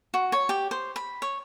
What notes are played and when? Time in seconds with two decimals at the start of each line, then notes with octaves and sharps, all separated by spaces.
0.14 F#4
0.32 C#5
0.49 G4
0.71 C5
0.96 B5
1.22 C#5